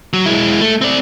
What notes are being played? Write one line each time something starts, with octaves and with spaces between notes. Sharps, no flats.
F#3
G#3 E4
A3
C4 D5